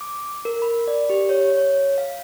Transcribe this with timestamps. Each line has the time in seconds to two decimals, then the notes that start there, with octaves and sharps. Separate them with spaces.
0.01 D6
0.45 A#4
0.62 B5
0.88 D5
1.10 G4
1.29 C#5
1.57 C#5
1.98 F5